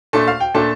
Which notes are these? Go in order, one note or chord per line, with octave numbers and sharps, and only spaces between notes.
A#2 A3 D4 A5
F5
G5
A#2 A3 D4 A5